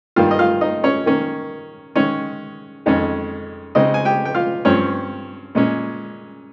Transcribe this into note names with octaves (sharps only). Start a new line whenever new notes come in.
G2 D#3 G3 A#3 F4 F5
D#5
F4 F5
D#4 D#5
C#4 C#5
D#3 A#3 C#4
D#3 G#3 C#4 C#5
F2 D#3 G#3 C#4
C#3 G#3 C4 D#4 D#5
G#5
G4 G5
G5
F4 F5
G2 F3 C4 C#4 C#5
A#2 G#3 C#4